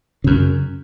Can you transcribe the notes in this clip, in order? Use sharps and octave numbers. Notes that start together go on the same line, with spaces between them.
F#2 C#3